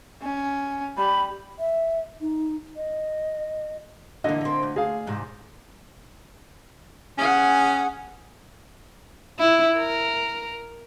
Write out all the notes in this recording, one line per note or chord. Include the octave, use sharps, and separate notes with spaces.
C#4
G3 B5
E5
D#4
D#5
D3 E3 A#3 D#5
A#3 C4
D2
G#4 F5
E2 G#2 C3
C#4 G#4 F#5
E4
A#4